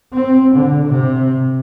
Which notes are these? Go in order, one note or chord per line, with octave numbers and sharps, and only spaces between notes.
C4
D3
C3